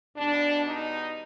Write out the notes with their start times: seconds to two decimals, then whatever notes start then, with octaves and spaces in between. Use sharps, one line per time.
0.16 E2 B2 G3 D4
0.66 D#4